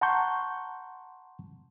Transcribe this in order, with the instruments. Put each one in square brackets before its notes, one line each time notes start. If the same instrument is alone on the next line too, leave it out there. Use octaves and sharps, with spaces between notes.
[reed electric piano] F#5 A5 A#5 C6 C#6 G6